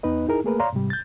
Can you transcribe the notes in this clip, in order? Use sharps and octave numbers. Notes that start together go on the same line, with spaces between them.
E2 B3 D#4 B4 D#5
D#4 E4 G#4 A#4
A3 A#3 G#4 A#4 B4
C#5 D5 F5 A#5 C6
G#2 C3 G3
G6 A6